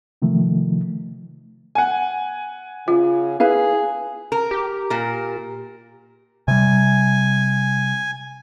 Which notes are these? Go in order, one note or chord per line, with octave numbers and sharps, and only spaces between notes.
C3 D#3 F3 A3
F#5 G#5
C#3 F4
E4 G#4 B4 F5
A#4
G4
A#2 A#4
C3 G3 G#5